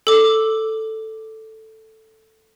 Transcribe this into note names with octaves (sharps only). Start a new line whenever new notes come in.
A4 D6